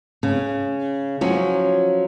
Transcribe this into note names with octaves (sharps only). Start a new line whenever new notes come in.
C#3
F3 F#3 C#4